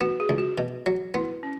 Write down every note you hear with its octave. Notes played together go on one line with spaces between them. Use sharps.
B3 F#4
G#4
C#2
F#4
B2
F#3
B3 E4
C#4